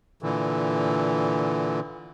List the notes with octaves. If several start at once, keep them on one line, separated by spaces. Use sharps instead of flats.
A#2 D3 E3